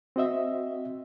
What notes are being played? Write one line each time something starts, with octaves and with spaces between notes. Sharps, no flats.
C4 F#4 D#5 E5